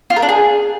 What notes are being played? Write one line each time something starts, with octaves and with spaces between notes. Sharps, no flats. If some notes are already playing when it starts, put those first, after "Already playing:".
F4
A#4
D4
G#4